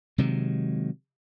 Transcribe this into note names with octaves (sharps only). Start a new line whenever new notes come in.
C3 D#3 F#3 G#3